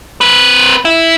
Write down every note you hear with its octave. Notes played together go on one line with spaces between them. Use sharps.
C4 B4
E4